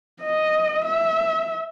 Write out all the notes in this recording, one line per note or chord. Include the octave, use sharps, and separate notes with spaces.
D#5
E5